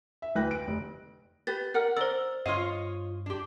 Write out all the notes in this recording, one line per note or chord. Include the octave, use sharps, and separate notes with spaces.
E5
D2 E3 B4 G5 F#6 A#6
D7
F1
G4 B4 A6
A#4 D5 F#5 F6 F#6
A#4 C5 D5 E6
G2 F4 C#5 D#5 F5
D4 G4